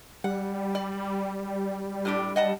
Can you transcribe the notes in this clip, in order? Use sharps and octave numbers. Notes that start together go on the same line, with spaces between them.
G3 F#5
D5
A2 D4 G4
D#5 F#5 A5